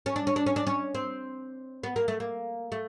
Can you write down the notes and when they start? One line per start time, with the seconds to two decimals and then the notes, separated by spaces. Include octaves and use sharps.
0.06 C#4
0.16 D4
0.27 C#4
0.36 D4
0.46 C#4
0.56 D4
0.67 C#4
0.95 C4
1.83 B3
1.96 A#3
2.08 A3
2.20 A#3
2.72 A3